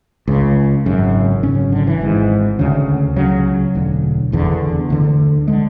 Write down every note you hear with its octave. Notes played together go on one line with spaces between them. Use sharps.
C#2 C#3
G#1 F#2 C#3
G#1 F#2 C#3 C#4
D3
E3
G#1 G#2
D2 C#3
C#2 C#3 F#3
E1 D2 D3
F#1 E2 D3
D2 D3
D3 G#3